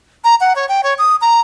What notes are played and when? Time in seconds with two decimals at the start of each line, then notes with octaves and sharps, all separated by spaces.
0.24 A#5
0.41 F#5
0.56 C#5
0.69 G5
0.83 C#5
0.99 D#6
1.21 A#5